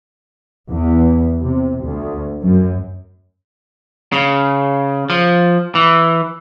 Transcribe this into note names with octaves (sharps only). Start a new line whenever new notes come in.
E2
C3
D2
F#2
C#3
F3
E3